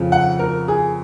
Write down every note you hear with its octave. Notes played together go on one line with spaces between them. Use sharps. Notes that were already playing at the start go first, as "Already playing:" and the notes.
Already playing: F2 C#3 F3
F#5
A#4
G#4